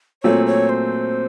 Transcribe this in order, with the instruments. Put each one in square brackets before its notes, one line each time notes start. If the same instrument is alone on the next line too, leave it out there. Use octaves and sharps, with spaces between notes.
[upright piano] A#2 F#3 A3 C4 [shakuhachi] C#5
[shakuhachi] C#5
C5